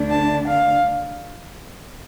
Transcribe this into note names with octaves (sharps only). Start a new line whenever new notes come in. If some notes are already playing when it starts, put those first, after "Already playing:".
Already playing: D2 D3 A3 D4
A5
F5